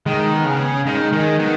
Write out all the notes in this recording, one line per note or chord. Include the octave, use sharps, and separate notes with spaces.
D#3 G#3
B3
C#3
C#4
D#3 G#3
D#3 G#3
D#3 B3